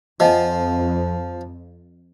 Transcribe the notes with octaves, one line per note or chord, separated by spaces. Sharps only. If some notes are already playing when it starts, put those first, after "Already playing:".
F2 F3 D#5 F#5 G#5